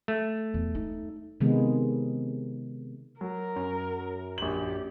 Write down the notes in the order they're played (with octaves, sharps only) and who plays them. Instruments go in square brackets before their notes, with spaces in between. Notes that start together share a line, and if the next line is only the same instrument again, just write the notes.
[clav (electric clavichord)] A3
[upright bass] E2
D#4
[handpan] C3 D#3 G#3 B3
[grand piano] F#3 [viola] A#4
[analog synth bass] F#2
[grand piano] A#1 F#7 [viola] G4